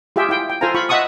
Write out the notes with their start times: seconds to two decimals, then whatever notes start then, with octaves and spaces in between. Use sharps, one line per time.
0.16 F4 G4 G#4 E5 G5
0.29 E4 F5 G5
0.50 G5
0.61 F4 A4 C5 F5 G#5 A#5
0.74 F4 B5 C#6
0.89 D#5 E5 F#5 A5 C#6 D#6